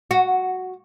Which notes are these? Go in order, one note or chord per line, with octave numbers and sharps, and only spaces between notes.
F#4